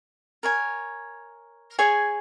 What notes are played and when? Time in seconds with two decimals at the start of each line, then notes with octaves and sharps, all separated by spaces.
0.43 A#4 C#5 G#5
1.79 G#4 C#5 G#5